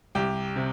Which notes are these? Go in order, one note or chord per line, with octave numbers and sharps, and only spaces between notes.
C2 G4
C3